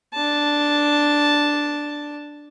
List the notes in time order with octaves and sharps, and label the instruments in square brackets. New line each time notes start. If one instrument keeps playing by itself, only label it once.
[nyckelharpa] D4 A5